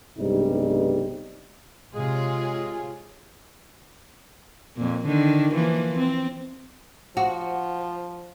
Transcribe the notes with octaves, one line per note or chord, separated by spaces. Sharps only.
B1 G2 C3 G3 G#3 D#4
C3 G#3 F4 G#4 C#5
F2 A#2
D3 D#3
E3 F3 A#3
C4
F3 F#4